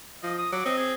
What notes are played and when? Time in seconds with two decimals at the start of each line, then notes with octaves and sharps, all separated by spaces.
0.23 F3 D#5
0.38 D#6
0.52 F#3 D6
0.66 C4 D#5
0.77 G#4